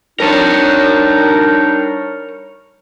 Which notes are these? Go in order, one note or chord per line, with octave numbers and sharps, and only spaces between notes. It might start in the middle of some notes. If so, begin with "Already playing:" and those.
G3 D4 D#4 A#4 C#5